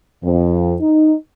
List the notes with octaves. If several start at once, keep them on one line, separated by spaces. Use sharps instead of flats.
F2
D#4